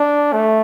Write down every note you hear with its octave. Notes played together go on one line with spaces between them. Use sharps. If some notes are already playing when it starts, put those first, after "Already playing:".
Already playing: D4
A3